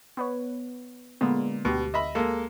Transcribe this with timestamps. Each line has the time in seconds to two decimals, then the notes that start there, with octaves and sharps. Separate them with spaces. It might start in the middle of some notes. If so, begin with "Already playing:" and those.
0.17 B3 B4 C#5
1.21 A#2 D3 G#3 B3
1.65 D2 B2 G4
1.94 D#5 E5 B5
2.15 G#3 A#3 A4